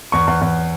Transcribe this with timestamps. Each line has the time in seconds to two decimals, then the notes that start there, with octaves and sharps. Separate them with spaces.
0.12 E2 C#6
0.27 E2
0.41 E2